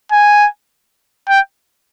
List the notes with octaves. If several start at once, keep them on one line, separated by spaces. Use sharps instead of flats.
G#5
G5